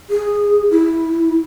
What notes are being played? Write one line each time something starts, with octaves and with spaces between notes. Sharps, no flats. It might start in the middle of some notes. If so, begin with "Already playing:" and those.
G#4
E4